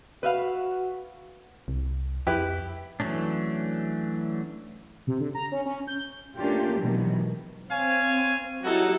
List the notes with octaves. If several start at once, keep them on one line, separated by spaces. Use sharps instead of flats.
F#4 B4 E5 F5
C2
F2 E4 G4 B4
E3 F#3 A3 C#4 D4
C3
D3
A#5
C#4
C#4
G6
A3 A#3 C#4 D4 F4 G4
B2 D#3 E3 F#3 G#3
C4 C#5 F5 G#5
F#3 G3 D#4 E4 F#4 A4